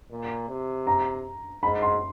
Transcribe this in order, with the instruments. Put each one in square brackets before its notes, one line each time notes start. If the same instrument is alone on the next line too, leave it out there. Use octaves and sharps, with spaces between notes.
[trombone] A#2
C3
[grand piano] A#5
[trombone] G#2 [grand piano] B5
[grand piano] C6